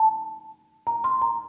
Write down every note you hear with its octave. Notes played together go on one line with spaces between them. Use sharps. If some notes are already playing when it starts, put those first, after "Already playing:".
Already playing: A5
A#5
C6
A#5